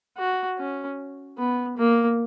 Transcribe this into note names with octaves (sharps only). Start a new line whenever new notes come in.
F#4
C#4
B3
A#3